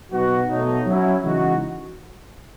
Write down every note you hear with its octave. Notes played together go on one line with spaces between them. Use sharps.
B2 F#3 B3 D#4 F#4
B2 F#3 A3 D#4
F#3 C#4 E4
C#3 E3 G#3 D#4 F#4